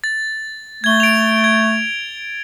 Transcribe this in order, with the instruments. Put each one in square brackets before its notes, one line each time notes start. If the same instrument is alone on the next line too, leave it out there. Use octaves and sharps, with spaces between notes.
[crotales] A6
[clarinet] A3 [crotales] G#6 G7
[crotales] D7 F7
G#6